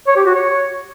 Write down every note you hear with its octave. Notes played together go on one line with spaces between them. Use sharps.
C#5
G4
F#4
C#5